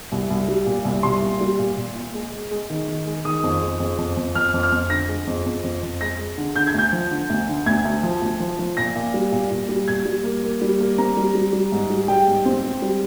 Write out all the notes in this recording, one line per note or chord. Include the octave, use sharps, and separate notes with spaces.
C2
C2
G3
A#2
C2
C2 C6
A#2
G3
A#2
A#2
A#2
G#3
G#3
G#3
D#3
D#3
G#3
D#3 D#6
F2
G#3
F2
F2
F2
F2 F6
F2
F6
F2
D3 A#6
G#3
F2
F2
F2
F2
G#3 A#6
G#3
D3
D3 G6
G#6
D2 G6
F3
D3
D2
D3
D2 G#6
D2
F3
D2
F3
F3
A#2 A#6
A#2
G3
A#2
A#2
G3
A#2 G#6
G3
A#3
A#3
G3
A#3
C4 A#5
G3
G3
G3
G#2
G3
G3 G5
G#2
C4
C4
G3